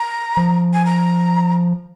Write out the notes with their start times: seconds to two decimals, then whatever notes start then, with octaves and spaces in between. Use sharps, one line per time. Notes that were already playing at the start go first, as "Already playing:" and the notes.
Already playing: A#5
0.37 F3
0.74 G#5
0.85 A#5